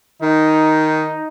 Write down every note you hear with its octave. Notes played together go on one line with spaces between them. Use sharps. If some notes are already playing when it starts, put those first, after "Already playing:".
D#3 D#4